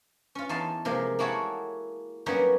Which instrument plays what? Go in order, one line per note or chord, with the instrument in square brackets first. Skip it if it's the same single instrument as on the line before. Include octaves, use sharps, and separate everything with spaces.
[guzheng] C#4 F4
E2 D#4 A5 C6
C3 F3 G#3 A#3
A#3 E4 F#4 G#4 A4 C#5
F#3 G3 A#3 B3 C#4 D#4